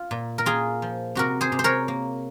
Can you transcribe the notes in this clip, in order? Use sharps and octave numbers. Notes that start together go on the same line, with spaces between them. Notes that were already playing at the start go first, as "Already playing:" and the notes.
Already playing: F4
A#2
A#4
A#3 F4 G#4
F3
C3 F#4 A#4
G#4 C5
C3
C5
A#4 C#5
A#3